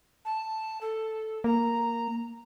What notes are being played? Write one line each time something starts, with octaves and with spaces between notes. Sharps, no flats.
A5
A4
A#3 A#5